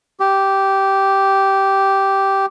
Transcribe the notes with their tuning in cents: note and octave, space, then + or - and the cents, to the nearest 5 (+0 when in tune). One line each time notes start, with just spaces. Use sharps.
G4 -10